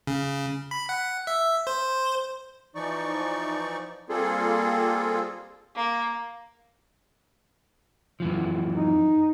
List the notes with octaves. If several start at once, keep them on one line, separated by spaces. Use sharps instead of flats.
C#3
B5
F#5
E5
C5
E3 F3 D#4 D5 C#6
G3 A#3 C4 F4 G#4 A4
A#3
F#2 E3 F3
D#4